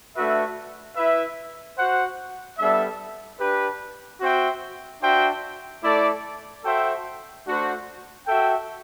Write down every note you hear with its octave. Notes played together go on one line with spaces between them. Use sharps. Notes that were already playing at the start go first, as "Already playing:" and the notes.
A3 D4 F#4 B4 E5
E4 B4 E5
F#4 C5 F#5
G3 B3 D4 A4 E5
D4 G4 B4
C4 F#4 C5 E5 G5
D4 F#4 C5 E5 G5
A3 E4 A4 D5
F#4 A4 C5 E5 G5
A3 D4 F#4 C5
F#4 A4 E5 G5